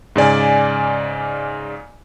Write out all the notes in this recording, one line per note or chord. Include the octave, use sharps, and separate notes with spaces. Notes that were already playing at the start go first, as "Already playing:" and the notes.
G#2 C#3 D5 G#5